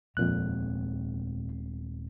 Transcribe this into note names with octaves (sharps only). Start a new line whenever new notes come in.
D#1 F2 A#2 G#3 C4 F#6